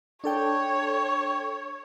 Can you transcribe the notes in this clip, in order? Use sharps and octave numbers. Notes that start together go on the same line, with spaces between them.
D4 A4 C#5 G5